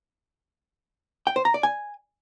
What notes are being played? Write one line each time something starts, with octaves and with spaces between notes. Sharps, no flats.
G5
C5
A#5
D5
G#5